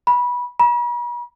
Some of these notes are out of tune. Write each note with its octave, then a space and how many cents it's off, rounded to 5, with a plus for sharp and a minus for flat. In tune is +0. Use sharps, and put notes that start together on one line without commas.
B5 -20
B5 -45